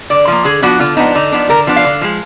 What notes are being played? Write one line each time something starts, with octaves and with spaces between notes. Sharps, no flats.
D3 D5
F3 A#3
D3 G#4
F3 B3 D4 F#4
D3 F4
F3 B3 D4 D#4
D3 D#4
F3 B3 D4
D3 A#4
F3 B3 D4
F5
D3
F3 G#3